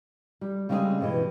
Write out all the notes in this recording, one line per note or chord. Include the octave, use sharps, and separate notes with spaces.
G3
C#3 G3 G#3 C4 E4 G#4
G2 B2 E3